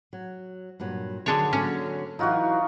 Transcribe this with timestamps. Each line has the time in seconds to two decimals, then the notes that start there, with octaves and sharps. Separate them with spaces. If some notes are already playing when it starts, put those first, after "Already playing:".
0.13 F#3
0.80 G2 A#2 F#3
1.26 D3 D#3 F#3 D4 G#4 C#5
1.53 D3 F#3 A#3 C#4
2.19 E3 F#3 D#4 F4 F#4